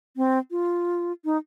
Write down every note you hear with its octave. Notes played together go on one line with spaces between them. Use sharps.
C4
F4
D#4